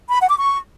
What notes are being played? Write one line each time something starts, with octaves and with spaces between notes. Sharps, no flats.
B5
F#5
D6
C#6